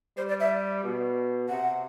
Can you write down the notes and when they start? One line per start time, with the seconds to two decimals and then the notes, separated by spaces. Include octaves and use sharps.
0.17 G3 C5
0.29 D5
0.40 E5
0.84 B2
1.49 C3 F#5